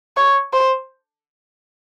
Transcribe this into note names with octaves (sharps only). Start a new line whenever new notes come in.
C#5
C5